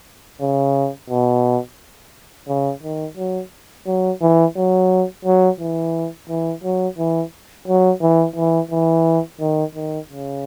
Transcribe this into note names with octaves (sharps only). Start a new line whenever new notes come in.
C#3
B2
C#3
D#3
F#3
F#3
E3
F#3
F#3
E3
E3
F#3
E3
F#3
E3
E3
E3
D#3
D#3
C#3